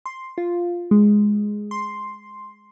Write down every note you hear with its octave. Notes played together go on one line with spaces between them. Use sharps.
C6
F4
G#3
C6